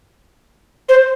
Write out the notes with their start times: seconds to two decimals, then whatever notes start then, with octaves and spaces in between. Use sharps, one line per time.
0.88 C5